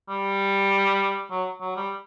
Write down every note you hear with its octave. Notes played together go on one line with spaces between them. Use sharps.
G3
F#3
F#3
G3